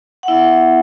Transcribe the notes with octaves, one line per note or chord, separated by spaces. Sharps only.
F#5
B3 E4 E5